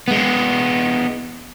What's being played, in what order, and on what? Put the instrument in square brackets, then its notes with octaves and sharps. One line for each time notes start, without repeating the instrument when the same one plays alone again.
[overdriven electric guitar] G#3 B3